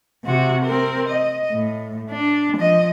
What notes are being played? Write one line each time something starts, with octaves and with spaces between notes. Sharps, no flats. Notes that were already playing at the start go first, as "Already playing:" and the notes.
C3 F#4
C4 A#4
D#5
A2
D4
F3 D#5